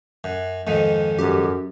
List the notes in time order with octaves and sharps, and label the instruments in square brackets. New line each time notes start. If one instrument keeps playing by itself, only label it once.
[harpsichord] F#2
F2 G#2 D#3
[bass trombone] F#2 [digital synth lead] G4